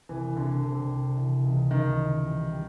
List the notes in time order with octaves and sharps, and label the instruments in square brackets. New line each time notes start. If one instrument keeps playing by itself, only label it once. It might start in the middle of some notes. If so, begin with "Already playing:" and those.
[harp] C2 [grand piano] E3
[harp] C2 [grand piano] D3
[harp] C3
C2
E3
C#2
[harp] C#2 [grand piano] D#3
[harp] E3
G3
G3